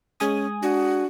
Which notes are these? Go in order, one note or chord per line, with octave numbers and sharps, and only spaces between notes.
G#3 C#4 G#5 D#6
D4 F#4